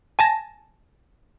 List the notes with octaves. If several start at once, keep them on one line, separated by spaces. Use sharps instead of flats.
G#5 A5 A#6